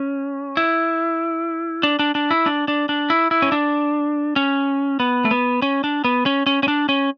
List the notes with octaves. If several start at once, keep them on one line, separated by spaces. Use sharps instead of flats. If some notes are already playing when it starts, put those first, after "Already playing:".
Already playing: C#4
E4
D4
D4
D4
E4
D4
D4
D4
E4
E4
C#4
D4
C#4
B3
A3
B3
C#4
D4
B3
C#4
C#4
C#4
D4
C#4